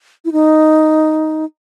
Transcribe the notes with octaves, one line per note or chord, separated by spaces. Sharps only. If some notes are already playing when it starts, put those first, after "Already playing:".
E4
D#4